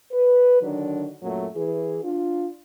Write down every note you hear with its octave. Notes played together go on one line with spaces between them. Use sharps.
B4
D3 D#3 F#3 D4
F#2 A#2 F#3 A3
E3 G#4
D4 F4